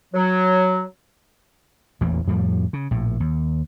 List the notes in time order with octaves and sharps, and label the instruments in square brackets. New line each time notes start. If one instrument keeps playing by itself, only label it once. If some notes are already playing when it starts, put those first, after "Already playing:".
[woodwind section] F#3
[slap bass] A1 E2 A#2
F2 A2 F3 G3
C#3
A#1 A2
D#2